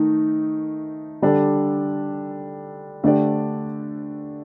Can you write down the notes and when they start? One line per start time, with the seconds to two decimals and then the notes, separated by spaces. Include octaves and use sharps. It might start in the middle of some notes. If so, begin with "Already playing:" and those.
Already playing: D#3 A3 D#4
1.22 D3 G3 D4 A4
3.04 D3 A3 D4 G4 D5